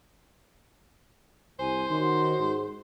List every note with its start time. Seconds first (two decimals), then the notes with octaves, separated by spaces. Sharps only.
1.59 C2 C5 G#5
1.90 D#3 C#4 D#4 F#4 C6
2.39 G#2